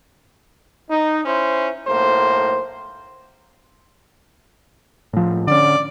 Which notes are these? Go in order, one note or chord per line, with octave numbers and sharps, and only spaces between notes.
D#4
C#4 E4 C5
B1 A2 A#3 C5
A2 F3
D3 C#4 D5